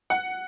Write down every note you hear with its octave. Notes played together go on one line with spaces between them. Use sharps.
F#5